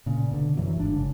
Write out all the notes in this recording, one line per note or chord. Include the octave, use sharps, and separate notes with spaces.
A#2 C#3
B2 D3
F#2 E3 F#3
G1 G#2 D4
C#3